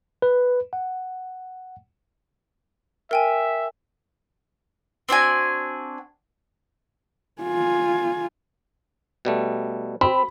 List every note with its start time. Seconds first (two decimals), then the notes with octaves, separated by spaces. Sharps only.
0.22 B4
0.73 F#5
3.11 A#4 E5 G5 G#5
5.09 C4 D4 F#4 G#5
7.42 F4 G#5
9.25 B2 G3 A3
10.01 C4 B5